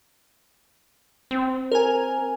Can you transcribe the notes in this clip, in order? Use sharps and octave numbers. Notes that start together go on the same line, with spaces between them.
C4
A#4 G#5